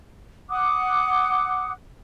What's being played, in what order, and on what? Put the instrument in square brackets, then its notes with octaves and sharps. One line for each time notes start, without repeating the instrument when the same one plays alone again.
[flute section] F#5 D6 D#6 F#6